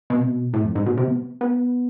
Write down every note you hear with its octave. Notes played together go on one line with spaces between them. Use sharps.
B2
C3
B2
A2
F2
G#2
B2
C3
B3
B3